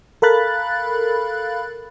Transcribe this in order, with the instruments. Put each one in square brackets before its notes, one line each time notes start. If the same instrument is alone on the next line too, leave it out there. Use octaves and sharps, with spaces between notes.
[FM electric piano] A4 A#4 F5 B5 F#6 A6